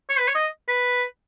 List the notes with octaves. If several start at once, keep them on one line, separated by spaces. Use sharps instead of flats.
C#5
B4
C#5
D#5
B4